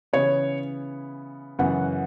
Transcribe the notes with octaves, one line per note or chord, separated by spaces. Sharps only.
C#3 E3 B3 C#5
F#2 C#3 E3 B3 F#5